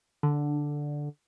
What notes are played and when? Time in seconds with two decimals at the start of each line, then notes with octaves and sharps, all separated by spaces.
0.23 D3